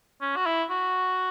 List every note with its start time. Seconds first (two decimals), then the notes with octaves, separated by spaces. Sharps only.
0.21 C#4
0.36 F#4
0.46 E4
0.70 F#4